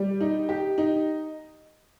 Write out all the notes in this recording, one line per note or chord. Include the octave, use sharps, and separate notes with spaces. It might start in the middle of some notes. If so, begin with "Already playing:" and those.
Already playing: G3
D#4
G4
D#4